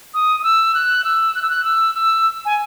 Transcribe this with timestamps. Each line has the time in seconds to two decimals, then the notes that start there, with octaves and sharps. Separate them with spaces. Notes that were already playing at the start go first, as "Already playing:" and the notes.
0.14 D#6
0.40 D#6
0.44 E6
0.74 F#6
1.04 E6
1.35 F#6
1.42 E6
1.50 F#6
1.64 E6
1.95 E6
2.45 G#5